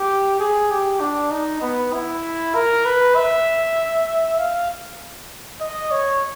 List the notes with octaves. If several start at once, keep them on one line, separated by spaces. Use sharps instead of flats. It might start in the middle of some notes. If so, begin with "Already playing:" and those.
Already playing: G4
G#4
G4
D4
D#4
B3
E4
A#4
B4
E5
F5
D#5
C#5